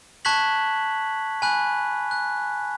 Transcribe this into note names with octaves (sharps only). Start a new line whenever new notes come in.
A5 C#6 F#6 G#6 B6 F#7
G#5 B5 F#6
F#6